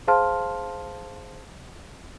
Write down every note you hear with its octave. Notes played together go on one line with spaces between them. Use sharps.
G#4 C5 F5 A5 C6 F6